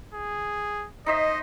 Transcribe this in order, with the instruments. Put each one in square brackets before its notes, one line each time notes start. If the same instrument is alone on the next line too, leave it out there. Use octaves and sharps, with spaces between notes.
[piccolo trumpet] G#4
[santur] D#4 C5 E5 [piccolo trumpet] D#5